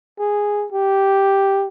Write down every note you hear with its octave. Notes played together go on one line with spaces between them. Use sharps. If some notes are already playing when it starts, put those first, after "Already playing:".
G#4
G4